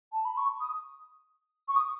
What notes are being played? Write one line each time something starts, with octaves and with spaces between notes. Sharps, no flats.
A5
B5
C#6
D#6
C#6
D#6